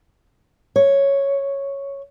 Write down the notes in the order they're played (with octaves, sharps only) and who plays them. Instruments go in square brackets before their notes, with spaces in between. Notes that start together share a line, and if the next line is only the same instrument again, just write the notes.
[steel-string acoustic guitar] C#5